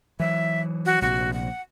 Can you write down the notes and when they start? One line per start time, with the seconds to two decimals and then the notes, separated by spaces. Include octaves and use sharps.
0.20 E3 F#3 E5
0.86 F#4
1.02 A#1 C3 F#4
1.33 F#5